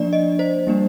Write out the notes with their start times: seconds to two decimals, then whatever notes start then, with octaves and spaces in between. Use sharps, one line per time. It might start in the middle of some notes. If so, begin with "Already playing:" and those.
Already playing: F3 A#3 D4 D5
0.13 D#5
0.39 C5
0.67 G3 A#3 D4